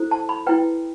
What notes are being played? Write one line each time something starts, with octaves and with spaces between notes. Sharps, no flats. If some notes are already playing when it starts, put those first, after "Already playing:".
Already playing: E4 A4 C5
A5
B5
E4 B4 G5